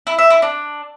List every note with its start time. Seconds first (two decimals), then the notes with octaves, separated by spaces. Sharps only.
0.07 E4
0.19 E5
0.30 E4
0.42 D4